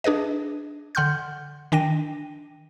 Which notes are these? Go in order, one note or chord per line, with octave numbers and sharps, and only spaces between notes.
D4 G#4 B4 D#5
D3 F#5 C6 F6 G6
D#3 D4 G5 A#6 D#7